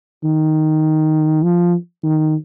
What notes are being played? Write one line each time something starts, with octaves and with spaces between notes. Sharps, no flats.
D#3
F3
D#3